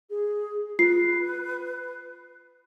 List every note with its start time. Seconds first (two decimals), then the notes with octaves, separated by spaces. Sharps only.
0.10 G#4
0.79 F4 B4 C7